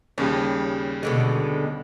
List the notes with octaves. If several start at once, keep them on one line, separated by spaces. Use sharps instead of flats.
D#2 C#3 G3 C#4
B2 D3 G#3